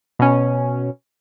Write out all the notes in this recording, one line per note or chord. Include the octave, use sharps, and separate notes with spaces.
B2 C#4